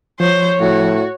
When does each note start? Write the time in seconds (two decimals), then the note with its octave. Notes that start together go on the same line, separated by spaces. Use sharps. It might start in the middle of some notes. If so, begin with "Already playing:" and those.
0.20 F3 C5 C#5
0.60 A2 F#4